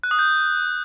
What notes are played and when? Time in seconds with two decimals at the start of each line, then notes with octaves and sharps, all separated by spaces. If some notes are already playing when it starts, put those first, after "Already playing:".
0.03 F#6
0.11 D#6
0.19 G6